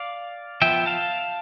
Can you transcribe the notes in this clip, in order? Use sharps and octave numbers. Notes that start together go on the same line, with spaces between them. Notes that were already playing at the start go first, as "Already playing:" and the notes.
Already playing: D5 F5
F3 B3 E5 G5
F5 A5